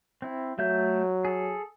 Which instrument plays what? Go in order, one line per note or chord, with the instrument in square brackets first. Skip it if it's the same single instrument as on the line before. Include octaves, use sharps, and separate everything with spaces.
[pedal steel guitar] C4 E4
[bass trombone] F#3 [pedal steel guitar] A3 E5 G6
[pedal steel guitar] G#4 A4